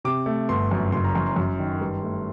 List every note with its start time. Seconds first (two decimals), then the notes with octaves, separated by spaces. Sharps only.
0.04 C3 D6
0.26 A3
0.49 G1 C6
0.71 F#2
0.92 F#1 C6
1.04 A#5
1.15 F#2 C6
1.26 C6
1.36 F#2
1.59 D#3
1.81 G2
2.03 A3